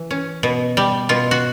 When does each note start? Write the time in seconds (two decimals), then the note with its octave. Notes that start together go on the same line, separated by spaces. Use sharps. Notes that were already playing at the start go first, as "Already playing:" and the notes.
Already playing: E3
0.11 C#4
0.43 B2
0.77 G3
1.09 B2 F4
1.31 F#4